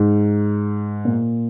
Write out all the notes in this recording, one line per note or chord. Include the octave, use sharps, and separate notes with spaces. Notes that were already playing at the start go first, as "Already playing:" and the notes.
Already playing: G#2
A#2